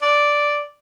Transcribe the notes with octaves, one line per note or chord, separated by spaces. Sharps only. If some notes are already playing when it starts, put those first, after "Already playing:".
D5